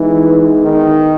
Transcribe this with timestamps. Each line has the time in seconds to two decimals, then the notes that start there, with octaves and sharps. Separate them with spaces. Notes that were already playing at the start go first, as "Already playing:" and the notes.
Already playing: E3 G#3 B3 D#4
0.63 D#3